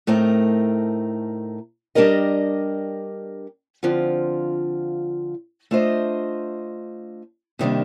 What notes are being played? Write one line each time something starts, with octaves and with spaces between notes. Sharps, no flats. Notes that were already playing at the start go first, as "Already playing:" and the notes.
A2 A3 C4 D#4 A#4
G3 D4 G4 A#4 D#5
D3 F3 C4 F4
A3 D4 F4 C5 D#5
C3 D#3 G3 A#3 D4